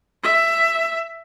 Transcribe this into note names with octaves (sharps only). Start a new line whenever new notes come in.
E5